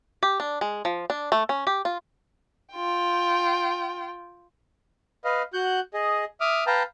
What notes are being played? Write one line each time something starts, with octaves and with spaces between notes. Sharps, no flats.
G4
D4
G#3
F3
D4
A3
C#4
G4
F4
F4 G5
B4 D#5 F5
F#4 F#5 F#6 G6
G#4 D#5
E5 D6 D#6 F6
B4 F5 G5 A5 A#5